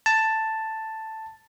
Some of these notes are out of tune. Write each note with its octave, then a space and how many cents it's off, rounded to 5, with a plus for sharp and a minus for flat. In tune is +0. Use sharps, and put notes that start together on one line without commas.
A5 +5